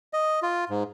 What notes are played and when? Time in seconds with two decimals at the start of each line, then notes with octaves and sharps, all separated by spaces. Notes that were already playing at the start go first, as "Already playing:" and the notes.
0.13 D#5
0.42 F4
0.69 G#2